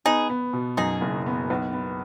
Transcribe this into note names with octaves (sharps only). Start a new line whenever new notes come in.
B3 D#4 G#4
B3
B2
F#2 D#4 G#4
F#1
B3
B1
B3